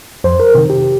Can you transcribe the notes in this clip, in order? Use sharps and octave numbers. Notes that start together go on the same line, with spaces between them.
F2 C5
A#4
C3 D#3
G4